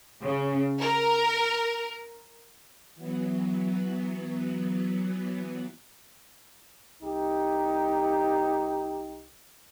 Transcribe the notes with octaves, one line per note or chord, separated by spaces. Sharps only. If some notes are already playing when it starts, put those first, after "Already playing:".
C#3
A#4
E3 F#3 B3
C2 D#4 G4